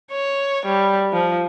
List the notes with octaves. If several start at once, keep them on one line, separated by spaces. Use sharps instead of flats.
C#5
G3
F3